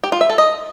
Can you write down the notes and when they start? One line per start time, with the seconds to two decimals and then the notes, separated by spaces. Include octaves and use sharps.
0.04 G4
0.12 F4
0.21 E5
0.30 A4
0.38 D#5